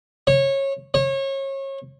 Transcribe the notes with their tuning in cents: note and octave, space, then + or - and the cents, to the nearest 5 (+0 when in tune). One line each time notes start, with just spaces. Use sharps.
C#5 -20
C#5 -30